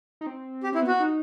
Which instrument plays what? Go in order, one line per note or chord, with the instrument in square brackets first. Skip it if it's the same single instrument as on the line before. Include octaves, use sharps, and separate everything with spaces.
[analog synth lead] D#4
C4
[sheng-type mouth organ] G4
[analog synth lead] C4 [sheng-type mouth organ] E4
[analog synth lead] B3
[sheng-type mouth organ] F#4
[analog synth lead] D#4